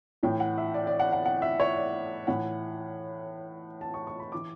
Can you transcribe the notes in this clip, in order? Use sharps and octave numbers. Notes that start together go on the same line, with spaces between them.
A2 E3 G5
F#5
E5
D5
D5
F#5
F#5
F#5
E5
C#5
D5
A2 E3 F#5
A5
C#6
C#6
B5
E3 D6